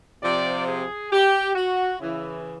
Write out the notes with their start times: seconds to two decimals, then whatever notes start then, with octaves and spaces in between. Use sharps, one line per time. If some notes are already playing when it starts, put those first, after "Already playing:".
0.23 C3 F3 D5
0.66 G#4
1.12 G4
1.56 F#4
1.99 C#3 E3 E4